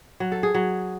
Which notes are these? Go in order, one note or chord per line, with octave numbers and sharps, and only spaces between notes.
F#3
A4
G#4
F#3